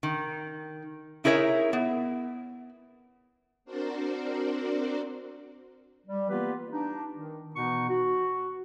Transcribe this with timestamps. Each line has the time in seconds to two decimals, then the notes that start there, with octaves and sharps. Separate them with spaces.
0.03 D#3
1.24 D#4 E4 G#4 A#4 C#5 E5
1.73 B3
3.65 C4 D4 F#4 A#4 C5 D5
6.07 G3
6.29 E3 A#3 B3 F4 G4 B4
6.71 D4 D#4
7.14 D#3
7.56 B2 E3 B3 D#4 F#5 C#6
7.89 F#4